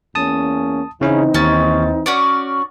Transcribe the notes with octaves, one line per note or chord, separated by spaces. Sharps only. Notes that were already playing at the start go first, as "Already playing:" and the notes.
E2 A#3 C#4 A5 D#6
C#3 E3 C4 C#4 D#4 E4
D#2 C#4 A6
C#4 F#4 D5 D6